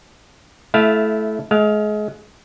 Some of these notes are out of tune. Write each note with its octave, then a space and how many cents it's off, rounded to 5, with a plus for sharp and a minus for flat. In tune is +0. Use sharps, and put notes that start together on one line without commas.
A3 -20 E4 +0 F5 +0
G#3 +30 F5 +0